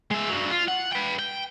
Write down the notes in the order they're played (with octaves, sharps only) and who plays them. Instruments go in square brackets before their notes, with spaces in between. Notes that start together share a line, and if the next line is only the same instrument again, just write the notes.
[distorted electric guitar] G#3 E5
G2 F#3
F4
F#5
B4 G5
G5